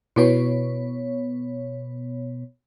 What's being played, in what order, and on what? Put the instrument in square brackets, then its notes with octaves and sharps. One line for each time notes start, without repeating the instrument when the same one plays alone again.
[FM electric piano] B2 B3 C#5 [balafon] E4 F#4 B4